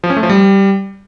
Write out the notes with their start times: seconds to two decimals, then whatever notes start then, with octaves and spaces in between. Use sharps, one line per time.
0.04 F3
0.10 C#4
0.17 A3
0.23 F3
0.30 G3